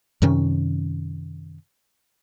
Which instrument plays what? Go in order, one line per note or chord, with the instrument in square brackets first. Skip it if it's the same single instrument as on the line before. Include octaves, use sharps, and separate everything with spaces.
[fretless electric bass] F#2 C3 D#3 C#4